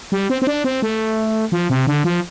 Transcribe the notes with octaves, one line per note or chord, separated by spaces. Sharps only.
G3
C4
C4
D4
C4
A3
F3
C3
D3
F3